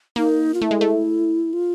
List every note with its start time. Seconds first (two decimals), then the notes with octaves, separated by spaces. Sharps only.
0.16 A#3 D#4
0.54 F4
0.61 A3 E4
0.71 G#3
0.81 A3
1.53 F4